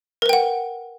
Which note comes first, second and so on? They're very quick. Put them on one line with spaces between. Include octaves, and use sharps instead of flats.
A#4 B4 G5 F#5